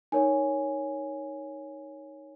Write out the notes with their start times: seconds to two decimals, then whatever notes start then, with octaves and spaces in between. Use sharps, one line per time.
0.12 D#4 A#4 C#5 G#5